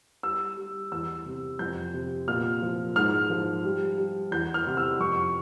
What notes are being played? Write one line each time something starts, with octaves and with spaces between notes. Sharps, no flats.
G3 E6
G3
E2 E6
C3
F2 G6
C3
A#2 F6
F3
G#2 F6
F3
G3
G3
E2 G6
F6
C3
E6
F2 C#6